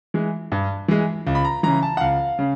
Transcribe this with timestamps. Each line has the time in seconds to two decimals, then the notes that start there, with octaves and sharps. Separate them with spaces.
0.14 E3 G#3
0.52 G2
0.88 E3 G#3
1.27 C#2
1.35 B5
1.45 A#5
1.63 C#3 E3 A#5
1.83 A5
1.97 F#5
2.01 C#2 F5
2.39 C#3